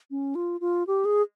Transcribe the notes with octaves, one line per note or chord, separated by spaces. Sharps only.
C#4
F4
F4
G4
G#4